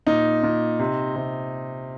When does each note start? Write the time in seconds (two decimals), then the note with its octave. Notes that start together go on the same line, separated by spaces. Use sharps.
0.07 A#2 D#4
0.43 A#2
0.79 C3
1.16 C3